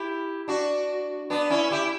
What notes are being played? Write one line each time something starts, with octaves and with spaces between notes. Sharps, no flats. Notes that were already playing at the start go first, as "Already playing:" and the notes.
Already playing: E4 G4
D4 F#4
B3 D4
C#4 E4
E4 G4